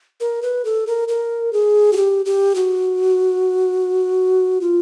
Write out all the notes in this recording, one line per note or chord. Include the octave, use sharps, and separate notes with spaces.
A#4
B4
A4
A#4
A#4
G#4
F#4
G4
G4
F#4
F4